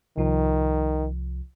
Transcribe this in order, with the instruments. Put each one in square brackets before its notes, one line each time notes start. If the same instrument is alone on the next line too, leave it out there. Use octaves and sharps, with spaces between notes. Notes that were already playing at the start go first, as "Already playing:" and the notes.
[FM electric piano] C2 F3 [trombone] D#3